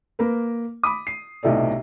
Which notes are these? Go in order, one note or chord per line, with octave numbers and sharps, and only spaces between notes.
A#3 A#4 B4
B5 D6 D#6
C7
B1 A2 C3 A4 D5